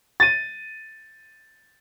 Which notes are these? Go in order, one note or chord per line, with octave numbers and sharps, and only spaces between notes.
A6 D#7